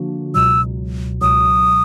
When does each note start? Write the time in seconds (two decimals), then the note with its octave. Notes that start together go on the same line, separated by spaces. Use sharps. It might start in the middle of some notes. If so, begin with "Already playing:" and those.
Already playing: D3 F3 A#3 D4 F#4
0.34 C#2 B2 F#3 E6
1.21 C#2 B2 F#3 D#6